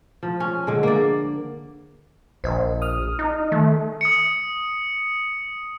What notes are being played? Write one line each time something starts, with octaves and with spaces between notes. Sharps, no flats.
F3
C#4
D3 G#3
A#3 D5
A#1 C5 D#5
D#6 F6
D#4
D#3 A3
D#6 C#7